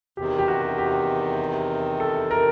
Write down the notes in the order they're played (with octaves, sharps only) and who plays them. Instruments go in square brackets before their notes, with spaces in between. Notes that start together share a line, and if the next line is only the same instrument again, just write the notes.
[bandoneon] E2 C3 D#3 [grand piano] G4
[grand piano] G4
F#4
G4
A4
A#4